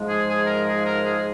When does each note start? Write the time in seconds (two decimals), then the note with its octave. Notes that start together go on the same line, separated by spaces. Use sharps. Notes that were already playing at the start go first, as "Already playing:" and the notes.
Already playing: G#2 F3 G#3
0.09 G#4
0.29 G#4
0.47 A#4
0.67 G#4
0.86 A#4
1.06 G#4